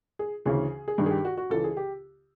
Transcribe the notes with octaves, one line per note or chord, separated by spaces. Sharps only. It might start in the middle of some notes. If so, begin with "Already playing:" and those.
G#4
D2 C#3 E3 G#4
G#4
G2 D#3 G4
G#4
G4
F#4
F#4
C#2 C#3 E3 A4
G#4
G4